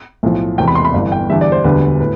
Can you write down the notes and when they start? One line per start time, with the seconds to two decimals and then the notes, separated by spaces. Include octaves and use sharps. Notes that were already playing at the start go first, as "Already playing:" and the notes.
0.23 B1 A2 F3
0.58 E1 E2 C3 G5
0.68 B5
0.75 C6
0.85 B5
0.93 G1 G2 E3
1.12 G5
1.30 E2 D3 G3 E5
1.41 D5
1.52 C5
1.64 E1 D2 D3 G3 B4
2.00 A2 B4